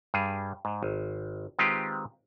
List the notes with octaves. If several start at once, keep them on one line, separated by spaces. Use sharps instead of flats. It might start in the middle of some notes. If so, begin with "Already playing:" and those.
G2 G3 G#4
G#2
G#1
D#3 G#3 C4 F4 G4 B4